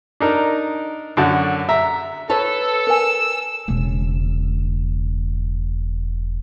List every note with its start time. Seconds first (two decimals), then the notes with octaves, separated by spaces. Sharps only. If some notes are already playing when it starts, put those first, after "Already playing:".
0.20 D4 D#4 A#4
1.17 F#2 D3 F#4 A5
1.69 E5 A#5
2.29 A4 B4 C#5 A5
2.87 A#4 G#5 E6
3.68 E1 C#3